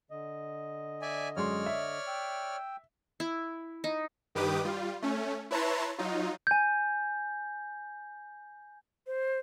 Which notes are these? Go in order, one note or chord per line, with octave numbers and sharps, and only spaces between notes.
D3 D#5
D5 E5 G#5
F#2 G#3 C#5 D5 C6 F6
E5
G5 E6
E4
D#4
G2 D#3 G4 B4 D6 D#6
G3 F4
A3 C#4
E4 B4 C#5 A5 A#5 C6
F#3 D#4 F4
G#5 G6
C5